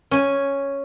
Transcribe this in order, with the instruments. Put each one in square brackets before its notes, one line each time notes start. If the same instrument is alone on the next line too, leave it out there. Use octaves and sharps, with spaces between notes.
[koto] C#4 G#5